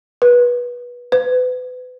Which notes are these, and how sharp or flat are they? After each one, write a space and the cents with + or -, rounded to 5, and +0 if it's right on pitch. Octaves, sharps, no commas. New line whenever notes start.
B4 -20
B4 +30